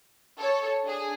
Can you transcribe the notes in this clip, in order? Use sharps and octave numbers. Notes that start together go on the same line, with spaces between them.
A4 C#5
D4 G#4